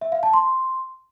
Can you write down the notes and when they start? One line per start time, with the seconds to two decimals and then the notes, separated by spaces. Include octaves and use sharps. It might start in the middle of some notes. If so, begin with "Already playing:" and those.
0.01 E5
0.12 F5
0.23 A5
0.34 C6